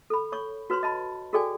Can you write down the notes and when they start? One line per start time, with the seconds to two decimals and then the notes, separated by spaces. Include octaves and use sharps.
0.10 A4 B5
0.32 C#5 C#6
0.70 F#4 B4 C#5 C6
0.83 D#5 A5 B5
1.33 F#4 G#4 A4 D5 G5 G#5